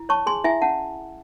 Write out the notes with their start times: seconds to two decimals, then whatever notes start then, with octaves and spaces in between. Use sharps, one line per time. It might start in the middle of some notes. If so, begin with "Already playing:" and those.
Already playing: E4
0.09 C#5 A5 C#6
0.26 G#4 G#5 C6
0.44 E4 E5 G#5
0.61 C#4 F#5 A5